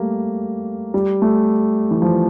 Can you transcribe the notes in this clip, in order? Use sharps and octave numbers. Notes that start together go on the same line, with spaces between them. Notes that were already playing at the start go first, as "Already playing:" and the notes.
Already playing: G3 A3 A#3
G3
A3
E3
F3